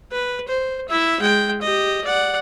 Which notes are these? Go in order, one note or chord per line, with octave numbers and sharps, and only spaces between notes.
B4
C5
E4 E5
G#3 G5
G4 D#5
D5 F#5